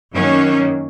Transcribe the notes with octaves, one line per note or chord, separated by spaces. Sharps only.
F#2 D#3 F#3 A#3 C#4